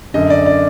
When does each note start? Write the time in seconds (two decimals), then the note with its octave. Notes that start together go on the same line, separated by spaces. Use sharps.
0.14 F#2 D3 D#5
0.30 D5
0.46 D5